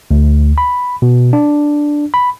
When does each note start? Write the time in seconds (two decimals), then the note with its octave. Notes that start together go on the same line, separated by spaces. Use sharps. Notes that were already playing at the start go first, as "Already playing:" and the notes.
0.11 D2
0.58 B5
1.02 B2
1.33 D4
2.14 B5